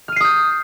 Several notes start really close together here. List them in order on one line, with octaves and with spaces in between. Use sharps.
F6 D#7 C7 D#6 G6